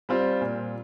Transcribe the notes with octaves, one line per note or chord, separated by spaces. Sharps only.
G3 C4 F4
A#2